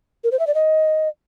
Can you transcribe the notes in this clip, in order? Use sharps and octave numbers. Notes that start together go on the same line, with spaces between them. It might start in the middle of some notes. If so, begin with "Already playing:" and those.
A#4
C5
E5
D5
D#5